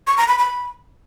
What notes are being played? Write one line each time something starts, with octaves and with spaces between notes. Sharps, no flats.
C#6
A#5
B5
B5